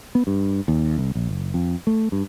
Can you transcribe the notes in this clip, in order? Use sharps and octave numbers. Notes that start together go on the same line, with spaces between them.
B3
G2
D#2
C2
A#1
F#1
F2
A3
G2